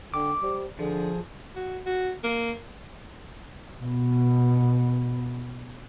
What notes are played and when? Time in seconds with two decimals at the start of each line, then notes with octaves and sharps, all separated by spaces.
0.14 D3 G5 D6
0.43 G3 C5
0.79 D3 F3 G#4
1.56 F#4
1.86 F#4
2.24 A#3
3.80 B2 B3